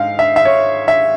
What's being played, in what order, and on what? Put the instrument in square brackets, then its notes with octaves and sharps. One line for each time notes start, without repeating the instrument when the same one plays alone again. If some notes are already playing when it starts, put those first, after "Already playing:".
Already playing: [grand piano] G#2 F5
E5
E5
C#5
E5